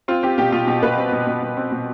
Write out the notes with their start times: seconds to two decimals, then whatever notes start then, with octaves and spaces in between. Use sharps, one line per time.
0.08 C4 F4
0.23 C4 G4
0.38 B2 G4
0.52 B2 F4
0.67 B2 G4
0.83 B2 B4
0.98 C4
1.12 B2
1.27 B2
1.42 B2
1.57 C4
1.72 B2